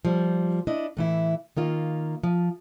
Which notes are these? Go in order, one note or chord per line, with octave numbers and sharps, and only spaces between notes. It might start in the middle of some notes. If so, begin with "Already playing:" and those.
F3 G3
D4 E4 D#5
A2 E3 E4
D#3 A#3 F4
F3